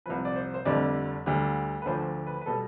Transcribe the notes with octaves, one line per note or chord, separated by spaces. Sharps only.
C2 C3 F3 B4
D5
C5
C5
F1 F2 D3 G3 D5
D2 D3 G3
B4
D2 D3 F3 C5
B4
B4
B2 G3 A4